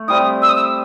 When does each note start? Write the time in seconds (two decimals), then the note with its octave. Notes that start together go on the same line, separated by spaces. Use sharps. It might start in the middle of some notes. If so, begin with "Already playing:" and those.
Already playing: A3
0.08 G3 C4 E4 D#6
0.42 E6
0.49 D#6
0.55 E6